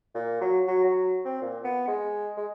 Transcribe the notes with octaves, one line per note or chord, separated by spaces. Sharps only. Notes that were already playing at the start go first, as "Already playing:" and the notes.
A#2
F#3
F#3
F#3
C4
A#2
B3
G#3
G#3